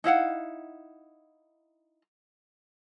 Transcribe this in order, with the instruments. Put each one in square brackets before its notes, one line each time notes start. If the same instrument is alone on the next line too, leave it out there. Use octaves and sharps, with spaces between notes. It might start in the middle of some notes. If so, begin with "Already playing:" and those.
[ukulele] D#4 E4 F5 F#5